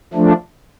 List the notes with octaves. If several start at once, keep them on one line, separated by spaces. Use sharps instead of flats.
F3 A3 D4